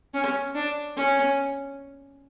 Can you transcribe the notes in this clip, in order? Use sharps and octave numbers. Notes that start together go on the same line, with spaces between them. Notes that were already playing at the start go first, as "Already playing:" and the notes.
C#4
D4
C#4